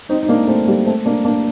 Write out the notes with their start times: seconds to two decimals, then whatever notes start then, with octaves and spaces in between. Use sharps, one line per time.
0.09 C4 D#4
0.23 D#4
0.28 A#3 D4
0.47 A3 C4
0.67 G3 A#3
0.86 A3 C4
1.05 A#3 D4
1.25 A#3 D4